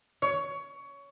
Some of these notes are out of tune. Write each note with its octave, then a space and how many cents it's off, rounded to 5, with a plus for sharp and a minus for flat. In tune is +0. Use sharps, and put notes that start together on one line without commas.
C#5 +20